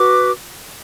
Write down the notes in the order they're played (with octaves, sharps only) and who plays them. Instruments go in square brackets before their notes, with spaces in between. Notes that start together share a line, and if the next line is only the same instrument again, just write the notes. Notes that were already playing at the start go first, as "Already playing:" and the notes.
Already playing: [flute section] F#4 B4 D6